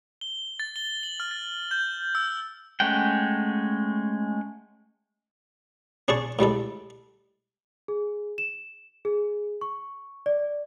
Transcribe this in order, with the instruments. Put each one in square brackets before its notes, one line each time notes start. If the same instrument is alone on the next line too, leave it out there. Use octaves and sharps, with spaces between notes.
[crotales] G7
A6
G7
F#7
F6
A6
G6
E6
[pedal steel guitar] G#3 A3 C#4 F#5 G5
[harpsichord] C#4 D4 G#4 A5 C#6
A2 G3 G#3 A4
[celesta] G#4
E7
G#4
C#6
D5